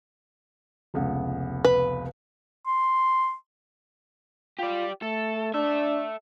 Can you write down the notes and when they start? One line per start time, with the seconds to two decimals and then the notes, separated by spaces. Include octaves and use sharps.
0.94 F1 C#2 B3
1.65 B4
2.67 C6
4.59 F4 G4 D5
5.03 A3 A4
5.54 D4 A4 E5